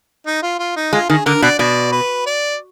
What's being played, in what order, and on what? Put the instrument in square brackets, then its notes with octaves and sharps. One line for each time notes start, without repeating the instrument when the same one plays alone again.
[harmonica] D#4
F4
F4
D#4
[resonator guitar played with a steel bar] G#3 [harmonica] F4
[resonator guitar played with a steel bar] D#3 [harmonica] G#4
[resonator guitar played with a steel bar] D3 [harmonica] A#4
[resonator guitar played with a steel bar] B2 [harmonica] D5
[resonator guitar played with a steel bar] B2 [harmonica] D5
[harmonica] B4
D5